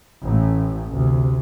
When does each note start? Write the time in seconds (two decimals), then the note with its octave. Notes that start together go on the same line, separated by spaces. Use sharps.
0.23 A1 A2
0.93 D2 C3